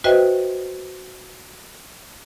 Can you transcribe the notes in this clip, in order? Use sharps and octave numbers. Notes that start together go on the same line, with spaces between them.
F#4 B4 C5 D#5 E5 G5